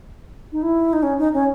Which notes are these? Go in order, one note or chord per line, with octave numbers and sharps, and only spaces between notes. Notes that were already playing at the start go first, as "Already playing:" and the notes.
D#4
E4
D#4
C#4
D#4
C#4